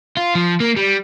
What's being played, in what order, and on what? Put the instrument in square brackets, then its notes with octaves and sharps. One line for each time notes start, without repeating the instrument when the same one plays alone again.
[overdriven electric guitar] F4
F3
A#3
G3